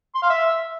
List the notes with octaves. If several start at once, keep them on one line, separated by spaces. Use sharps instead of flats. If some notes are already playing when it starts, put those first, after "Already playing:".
C6
F5
E5